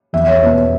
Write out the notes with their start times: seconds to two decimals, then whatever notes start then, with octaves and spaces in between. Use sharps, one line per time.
0.13 E2 E5
0.27 C#5
0.43 B2 B3 B4